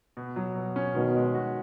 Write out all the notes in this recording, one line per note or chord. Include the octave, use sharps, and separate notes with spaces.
B2
F#3
B2
C#4
B2 D#3
G#3
F#4